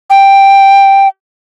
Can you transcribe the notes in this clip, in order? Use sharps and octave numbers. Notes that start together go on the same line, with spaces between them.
G5